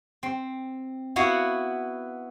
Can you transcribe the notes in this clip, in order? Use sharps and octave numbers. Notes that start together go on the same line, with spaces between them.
C4
B3 E4 F#4 F5 F#5